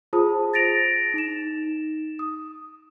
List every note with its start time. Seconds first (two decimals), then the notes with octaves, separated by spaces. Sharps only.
0.13 F4 G#4 C5 A5 D#6
0.54 A6 A#6 D7 F7
1.14 D#4 E7
2.19 D#6